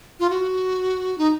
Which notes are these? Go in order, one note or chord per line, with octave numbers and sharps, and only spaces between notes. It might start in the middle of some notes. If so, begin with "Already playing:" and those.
F4
F#4
D#4